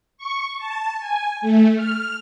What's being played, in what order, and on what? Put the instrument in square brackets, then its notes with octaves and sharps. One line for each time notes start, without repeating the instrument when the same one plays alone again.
[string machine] C#6
A5
G#5
A3
F6